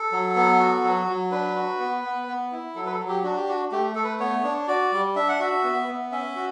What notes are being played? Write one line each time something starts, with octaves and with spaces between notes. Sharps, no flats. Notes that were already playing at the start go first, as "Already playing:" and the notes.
Already playing: A4
F#3
B3
F#4
F#3
F#3
D4 B4
F#4
B3
B3
B3
E4
F#3 A4
B4
A4
F#3
G4
D4 F#4
G4
F#4
A3 G4
A3 A4
B4
B3 C#5
D4
F#4 D5
G3
D4 E5
F#5
F#4 E5
B3
B3
C#4 E5
F#4